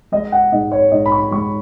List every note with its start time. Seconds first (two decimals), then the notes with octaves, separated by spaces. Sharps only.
0.12 G#3 D#5
0.32 F#5
0.52 G#2 D#5
0.72 C#5
0.92 G#2 D#5
1.06 B5
1.12 C#6
1.31 G#3 C#6